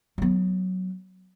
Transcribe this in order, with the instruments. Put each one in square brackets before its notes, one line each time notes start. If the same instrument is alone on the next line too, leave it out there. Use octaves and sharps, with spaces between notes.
[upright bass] F#3 B3